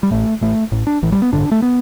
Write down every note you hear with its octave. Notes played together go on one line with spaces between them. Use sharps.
G3
A1 A2 A3
A1 A2 A3
A1 A2
D4
A1 A2 E3
G3
B3
A1 G2 D3 D4
A3
B3